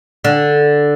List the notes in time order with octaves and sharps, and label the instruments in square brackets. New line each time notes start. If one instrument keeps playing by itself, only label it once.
[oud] D3